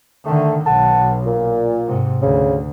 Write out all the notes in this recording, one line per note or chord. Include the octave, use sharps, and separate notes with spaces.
D3 D#3 A3
B1 F#5 A5
A#2
G#2 C3
D2 C#3